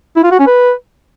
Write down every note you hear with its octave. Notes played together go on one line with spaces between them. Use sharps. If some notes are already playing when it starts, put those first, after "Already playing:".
E4
F4
F#4
C#4
B4